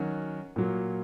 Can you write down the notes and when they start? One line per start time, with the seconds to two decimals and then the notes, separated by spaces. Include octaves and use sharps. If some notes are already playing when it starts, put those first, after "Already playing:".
Already playing: D#3 F#3 C#4 F#4
0.56 A#2 F#3 A#3